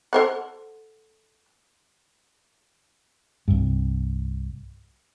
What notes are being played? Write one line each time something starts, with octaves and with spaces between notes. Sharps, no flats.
A4 C5 F#5
C2 G2